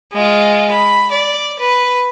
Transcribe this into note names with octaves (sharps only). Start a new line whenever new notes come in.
G#3 F4
B5
D5
B4